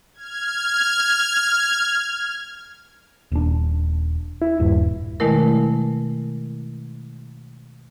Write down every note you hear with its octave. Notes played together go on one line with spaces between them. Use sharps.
F6 G#6
D#1 D4
E4
D#1 G2
B2 D#3 G#3 A3 E4 A#4